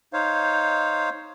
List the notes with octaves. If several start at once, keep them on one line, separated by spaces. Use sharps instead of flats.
D#4 C5 C#5 F5